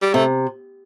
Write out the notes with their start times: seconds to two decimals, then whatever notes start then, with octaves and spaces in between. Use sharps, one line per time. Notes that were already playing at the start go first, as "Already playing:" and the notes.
0.02 G3
0.14 C3 A3